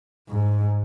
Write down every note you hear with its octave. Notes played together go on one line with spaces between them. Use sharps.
G#2